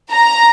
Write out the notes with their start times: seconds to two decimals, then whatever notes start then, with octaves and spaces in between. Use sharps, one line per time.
0.12 A#5